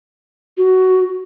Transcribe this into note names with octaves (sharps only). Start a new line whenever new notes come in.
F#4